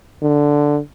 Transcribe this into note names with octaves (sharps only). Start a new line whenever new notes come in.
D3